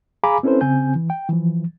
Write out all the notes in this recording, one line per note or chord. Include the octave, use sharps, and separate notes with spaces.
G#4 F5 G#5 A#5 B5 D6
C4 C#4 E4 A4 B4 C5
C#3 C4 G#5 G6
E3
G5
E3 F3